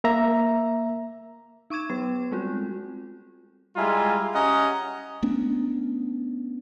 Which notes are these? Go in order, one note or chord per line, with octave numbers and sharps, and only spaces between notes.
A#3 E5 A#5
D#4 C#6 D6 G#6 E7
F#3 B3 B4
G3 G#3 C4 F4 F#4
G3 G#3 E4 F4 G#5 A#5
C#4 G4 D#5 F#5 A#5
A3 B3 C#4 D4